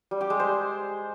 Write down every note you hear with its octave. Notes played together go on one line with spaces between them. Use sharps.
G3
G4
G#3
C5